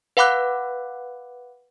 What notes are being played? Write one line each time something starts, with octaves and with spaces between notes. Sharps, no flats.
B4 F5 F#5 B5 D6 F#6